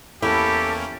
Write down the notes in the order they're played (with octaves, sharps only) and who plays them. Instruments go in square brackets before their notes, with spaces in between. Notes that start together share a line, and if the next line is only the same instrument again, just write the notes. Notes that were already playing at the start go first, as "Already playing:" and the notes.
[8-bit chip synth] E2 A#3 C#4 [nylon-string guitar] E4 [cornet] G4 [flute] A4